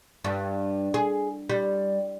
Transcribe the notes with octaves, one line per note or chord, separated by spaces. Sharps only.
G2
G#4
G3